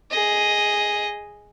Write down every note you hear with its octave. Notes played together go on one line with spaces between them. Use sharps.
G#4 D#5